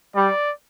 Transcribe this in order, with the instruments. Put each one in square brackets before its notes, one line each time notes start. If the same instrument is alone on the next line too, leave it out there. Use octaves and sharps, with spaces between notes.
[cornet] G3 [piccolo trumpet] D5